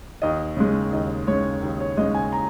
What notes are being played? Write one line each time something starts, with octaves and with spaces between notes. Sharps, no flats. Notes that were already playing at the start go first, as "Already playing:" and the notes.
D#2 D#5
C#3 G#3
D#2 D#5
C#3 G#3 C#5
D#2
C#5
C#3 G#3 D#5
G#5
A#5